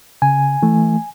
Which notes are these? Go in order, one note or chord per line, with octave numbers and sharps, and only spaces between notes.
C#3 G#5
E3 A3